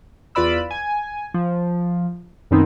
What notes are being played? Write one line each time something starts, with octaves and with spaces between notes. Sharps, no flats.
E2 F4 B4 D5 B5 E6
G#5
F3
F#2 B2 D#3 B3 C4 D#4